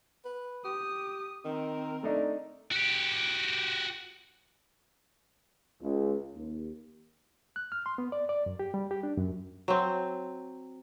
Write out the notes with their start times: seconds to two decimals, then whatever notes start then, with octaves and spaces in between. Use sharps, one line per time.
0.25 B4
0.65 G4 D#6
1.45 D#3 C4 A#4
2.03 A3 D4 D#4
2.72 F#4 G4
5.81 C#2
6.35 D#2
7.56 F#6
7.72 F6
7.86 C6
7.98 B3
8.12 D5
8.29 D5
8.46 F#2
8.59 G4
8.74 G3
8.91 G4
9.03 D4
9.18 F#2
9.68 F#3 C4